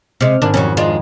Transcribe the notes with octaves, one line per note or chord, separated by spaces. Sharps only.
C3 G#3 F6
G#1 D4 G#5
F2 F#3 G3 C#4
G#3 D4 F4